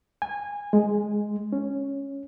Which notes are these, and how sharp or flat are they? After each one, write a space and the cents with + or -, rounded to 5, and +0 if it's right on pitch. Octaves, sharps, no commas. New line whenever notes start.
G#5 -20
G#3 +5
C#4 -5